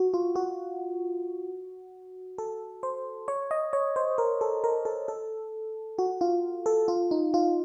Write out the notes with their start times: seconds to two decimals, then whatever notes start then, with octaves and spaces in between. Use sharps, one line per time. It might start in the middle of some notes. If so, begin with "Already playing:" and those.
Already playing: F#4
0.14 F4
0.36 F#4
2.38 A4
2.83 C5
3.28 C#5
3.51 D#5
3.73 C#5
3.96 C5
4.18 A#4
4.41 A4
4.64 A#4
4.85 A4
5.08 A4
5.99 F#4
6.21 F4
6.66 A4
6.88 F4
7.11 D#4
7.34 F4